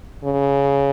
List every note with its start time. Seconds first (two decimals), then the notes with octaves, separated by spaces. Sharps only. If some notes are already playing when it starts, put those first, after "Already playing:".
0.24 C#3